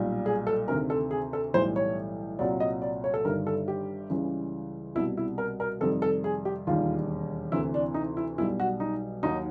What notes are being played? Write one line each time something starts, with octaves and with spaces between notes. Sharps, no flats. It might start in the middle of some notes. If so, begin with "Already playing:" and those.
Already playing: B1 A#2 G3
G#4
A4
D2 C3 D#3 A#4
A4
G#4
A4
B1 A2 E3 G3 C5
C#5
C2 A#2 F#3 D5
D#5
D5
C#5
A4
G1 G2 D#3 G3 A#4
A4
G4
C#2 C#3 E3 G3
C2 B2 G3 E4
E4
A#4
A#4
F2 C3 D#3 G3 A4
A4
G#4
G4
E1 D#2 D#3 G3 F4
D2 C3 E3 E4
D4
D#4
E4
B1 B2 G3 E4
F#4
D#4
D#2 D#3 F#3 D#4